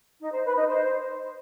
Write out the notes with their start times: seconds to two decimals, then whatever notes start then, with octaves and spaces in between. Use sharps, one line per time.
0.20 D#4
0.32 C5
0.44 B4
0.56 D#4
0.68 C5